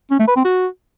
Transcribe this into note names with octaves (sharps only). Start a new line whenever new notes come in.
C#4
A3
B4
C4
F#4